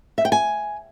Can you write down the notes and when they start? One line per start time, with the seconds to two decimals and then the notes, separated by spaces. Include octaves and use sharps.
0.18 E5
0.25 G5
0.32 G#5